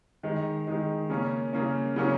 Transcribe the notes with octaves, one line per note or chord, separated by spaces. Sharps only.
D#3 G#3 D#4
D#3 G#3 D#4
C#3 A#3 C#4
C#3 A#3 C#4
C#3 F#3 A#3 C#4